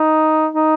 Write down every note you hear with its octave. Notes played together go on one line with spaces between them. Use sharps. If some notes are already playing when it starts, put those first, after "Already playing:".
Already playing: D#4
D#4